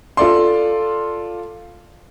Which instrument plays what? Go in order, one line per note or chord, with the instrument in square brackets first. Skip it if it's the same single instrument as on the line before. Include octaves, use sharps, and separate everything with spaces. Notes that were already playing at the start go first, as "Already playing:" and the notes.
[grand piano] F4 A4 D5 C6